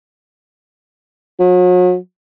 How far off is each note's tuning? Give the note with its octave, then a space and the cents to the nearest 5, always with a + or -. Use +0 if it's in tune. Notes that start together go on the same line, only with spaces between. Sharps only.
F#3 -40